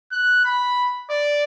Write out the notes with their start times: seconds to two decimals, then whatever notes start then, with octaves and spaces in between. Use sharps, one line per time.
0.12 F#6
0.45 B5
1.10 D5